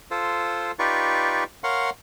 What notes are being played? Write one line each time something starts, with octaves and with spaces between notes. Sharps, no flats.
F4 A4 C5
D#4 F4 G4 B4 D5 C#6
A#4 C#5 F5 F#5 C6